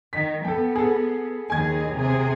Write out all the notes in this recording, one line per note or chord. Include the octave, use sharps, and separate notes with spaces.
D#3 B6
B3 A4 G5
G#4 A4
D#2 D#3 G#4 G#5 G#6
C3 G#4